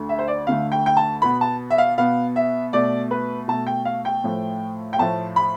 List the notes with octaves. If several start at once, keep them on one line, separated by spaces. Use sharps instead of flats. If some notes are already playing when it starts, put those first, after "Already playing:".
Already playing: D2 D3 A3
E5
C5
D5
D2 D3 A3 F5
G5
G5
A5
B2 B3 B5
A5
E5
F5
B2 B3 F5
E5
B2 A3 D5
B4
B2 A3 A5
G5
F5
G5
A2 F3 A3
G5
A2 F3 A3 A5
B5